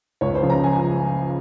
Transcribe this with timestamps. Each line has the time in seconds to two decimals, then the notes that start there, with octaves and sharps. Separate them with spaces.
0.21 C#2 C#5
0.35 C5
0.43 C#3 F3
0.50 A#5
0.64 G#5